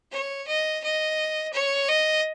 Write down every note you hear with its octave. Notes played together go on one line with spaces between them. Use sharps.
C#5
D#5
D#5
C#5
D#5